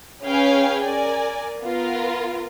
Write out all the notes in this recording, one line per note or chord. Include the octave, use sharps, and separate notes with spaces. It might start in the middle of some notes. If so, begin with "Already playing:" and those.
C#4 G#4 B4 F5 G5 G#5
A#4 D5 G#5
B3 F4 A#4